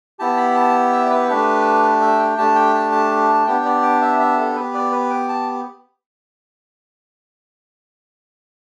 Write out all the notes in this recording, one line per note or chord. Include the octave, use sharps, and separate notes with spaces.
B3 E4 G4 A5
B5
A5
E5
D5
B4
A3 D4 G4
D5
E5
G5
A3 D4 G4 A5
G5
A5
A5
A5
B3 D4 G4 G5
D5
G5
E5
E5
A4
B3 G4 B4
D5
B4
G5
A5